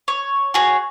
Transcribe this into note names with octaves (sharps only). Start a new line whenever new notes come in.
C#5
F#4 G#4 C#5